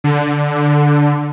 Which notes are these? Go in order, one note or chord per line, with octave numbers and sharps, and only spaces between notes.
D3